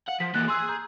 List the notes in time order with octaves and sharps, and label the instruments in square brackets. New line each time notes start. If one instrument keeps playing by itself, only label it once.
[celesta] F5 [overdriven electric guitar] F#5
[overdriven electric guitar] F3 [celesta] B6
[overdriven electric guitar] E3 A#3 [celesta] F#6 A6
[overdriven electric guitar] G#4 [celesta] C6 E6 F#6
[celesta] A#5 G6